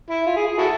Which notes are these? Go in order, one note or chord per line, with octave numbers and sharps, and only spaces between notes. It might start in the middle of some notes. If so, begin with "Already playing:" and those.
E4
F4
G#4
G#4
E4 F#4 A4